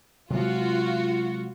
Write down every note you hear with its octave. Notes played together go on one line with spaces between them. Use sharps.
C3 F#3 G#3 F4 F#4